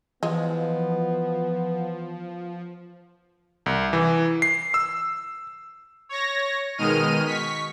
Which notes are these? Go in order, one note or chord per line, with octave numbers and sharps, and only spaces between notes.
E3 F3 G#3 B3
C2
E3
C7
E6
C#5 A#6
B2 D#3 G#3 D#5 F6 D#7
C#6 B6